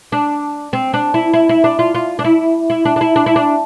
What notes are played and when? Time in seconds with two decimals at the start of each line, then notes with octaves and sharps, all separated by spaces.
0.12 D4
0.73 C4
0.94 D4
1.14 E4
1.34 E4
1.49 E4
1.64 D4
1.79 F4
1.95 F4
2.19 D4
2.24 E4
2.70 E4
2.85 D4
2.96 D4
3.01 E4
3.16 D4
3.26 E4
3.36 D4